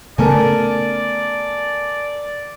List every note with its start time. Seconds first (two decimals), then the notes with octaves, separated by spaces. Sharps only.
0.18 C#3 A3 B3 A4 A#4 D5 G#5